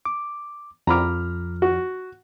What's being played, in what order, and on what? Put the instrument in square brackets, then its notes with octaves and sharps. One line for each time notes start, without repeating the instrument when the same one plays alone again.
[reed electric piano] D6
[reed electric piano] F2 F3 F6 [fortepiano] A#5 B5 D6
[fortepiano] F#4